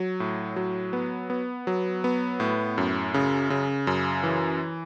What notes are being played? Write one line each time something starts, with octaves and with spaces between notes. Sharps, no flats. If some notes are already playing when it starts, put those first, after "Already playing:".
Already playing: F#3
A2
F#3
B3
B3
F#3
B3
A2
F#2
C#3
C#3
F#2
E3